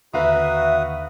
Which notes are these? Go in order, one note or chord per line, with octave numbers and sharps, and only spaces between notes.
D#2 D3 F#4 B4 E5 F5 A#5 D#6